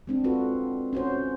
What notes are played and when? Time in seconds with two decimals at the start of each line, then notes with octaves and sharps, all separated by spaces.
0.07 G#3 C4 D4
0.24 C4 F4 F#4 A4 B4
0.93 C#4 F#4 C5